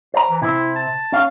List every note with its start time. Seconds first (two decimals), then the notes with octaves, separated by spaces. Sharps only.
0.14 C5 A#5
0.30 E3
0.42 C3 C4 E4
0.76 A5
1.12 C#4 F5